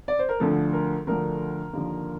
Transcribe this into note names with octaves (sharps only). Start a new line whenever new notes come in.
D5
C5
A#4
D2 D3 F3 A3 A4
A#4
D2 D3 F3 A3 A#4
D#2 D3 F3